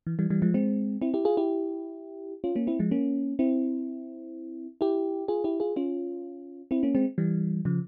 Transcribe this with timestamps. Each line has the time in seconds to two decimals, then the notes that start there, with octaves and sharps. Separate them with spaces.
0.07 E3
0.19 E3 G3
0.30 E3 G3
0.42 F3 G#3
0.54 G#3 C4
1.02 C4 E4
1.14 E4 G4
1.25 F4 G#4
1.37 E4 G4
2.44 C#4 F4
2.55 A#3 C#4
2.67 C4 E4
2.79 F3 G#3
2.91 A#3 C#4
3.39 C4 E4
4.81 E4 G4
5.28 F4 G#4
5.44 E4 G4
5.60 F4 G#4
5.76 C#4 F4
6.71 C4 E4
6.83 A#3 C#4
6.95 G#3 C4
7.18 E3 G3
7.65 C#3 F3